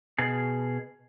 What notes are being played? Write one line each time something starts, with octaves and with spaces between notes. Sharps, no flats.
B2 G#4